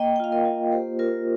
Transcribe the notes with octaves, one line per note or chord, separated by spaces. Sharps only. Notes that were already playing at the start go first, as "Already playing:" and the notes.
Already playing: A#3 D#5 G5
G5
F4 F5
A#4 D#5
F4
A#3 G4 C5
F4 A#4